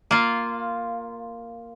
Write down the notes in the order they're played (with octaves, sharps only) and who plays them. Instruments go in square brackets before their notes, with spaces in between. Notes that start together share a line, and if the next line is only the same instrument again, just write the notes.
[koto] A#3 F4